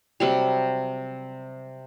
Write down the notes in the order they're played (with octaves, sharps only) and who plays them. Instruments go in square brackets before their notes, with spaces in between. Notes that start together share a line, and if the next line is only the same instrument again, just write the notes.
[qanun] C3 F#3 G3